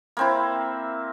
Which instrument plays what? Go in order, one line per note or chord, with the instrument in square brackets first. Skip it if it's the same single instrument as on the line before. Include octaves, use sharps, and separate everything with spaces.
[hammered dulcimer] A#3 C4 E4